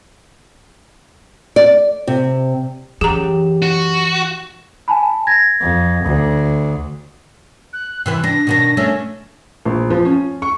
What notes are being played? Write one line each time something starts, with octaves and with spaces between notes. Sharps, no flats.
D5
C3
F#2 E3 G4 G#4 A#5
F#4
G#5 A5 B5
G#6 A#6
F2
D2
F#6
C3 E3 B4 F#6
D4 A#6
B2 D#3 D4
A3 C#4 D4
A#1
F3
C#4
C#6